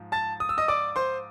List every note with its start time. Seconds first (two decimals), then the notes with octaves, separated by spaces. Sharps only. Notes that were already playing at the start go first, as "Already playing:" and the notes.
Already playing: G#2 F3
0.12 A5 A6
0.40 D#6
0.49 E6
0.58 D#5 D#6
0.68 D5 D6
0.96 C5 C6